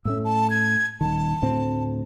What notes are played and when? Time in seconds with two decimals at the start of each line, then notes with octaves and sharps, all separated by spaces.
0.05 A2 A3 C#4 E6
0.25 A5
0.50 G#6
1.01 D#1 D#3 A5
1.42 D2 A2 C4